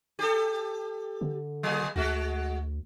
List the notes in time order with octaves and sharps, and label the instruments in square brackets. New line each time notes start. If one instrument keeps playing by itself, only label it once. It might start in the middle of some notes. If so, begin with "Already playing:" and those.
[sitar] G4 A4
[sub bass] D3
[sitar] F#3 A#3 G#4
[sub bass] D2 [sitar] G#3 F#4